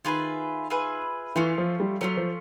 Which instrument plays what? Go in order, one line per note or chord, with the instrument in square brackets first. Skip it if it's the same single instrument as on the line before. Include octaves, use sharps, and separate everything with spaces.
[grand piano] D#3 [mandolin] F4 G#4 B4 E5
[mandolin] F4 G#4 B4 E5
[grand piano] E3 [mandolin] A3 C#4 F4
[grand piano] F3
G3
[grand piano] F#3 [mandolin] A3 C#4 F4
[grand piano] F3